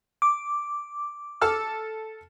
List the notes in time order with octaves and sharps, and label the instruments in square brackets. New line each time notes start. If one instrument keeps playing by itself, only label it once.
[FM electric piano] D6
[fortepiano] A4 A5 F6